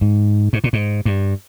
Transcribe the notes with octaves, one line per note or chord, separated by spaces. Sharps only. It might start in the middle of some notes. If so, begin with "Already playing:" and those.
G#2
G#2
A#2
G#2
G2